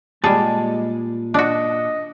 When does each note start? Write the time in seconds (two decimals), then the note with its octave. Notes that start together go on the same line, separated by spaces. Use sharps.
0.24 A#2 G3 G#3 G#4 A5
1.34 D4 F#4 D#5